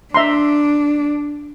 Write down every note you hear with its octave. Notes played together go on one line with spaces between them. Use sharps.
D4 E5 A#5 C6